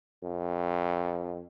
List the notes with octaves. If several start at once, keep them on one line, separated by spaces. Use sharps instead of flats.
F2